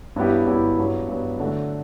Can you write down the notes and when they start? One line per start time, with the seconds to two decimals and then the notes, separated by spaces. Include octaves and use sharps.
0.16 G2 F#3 B3 E4 G4
0.47 G2 F#3 B3 E4 G4
0.78 G2 F#3 B3
1.08 G2 F#3 B3
1.39 D3 F#3 A3 D4 F#4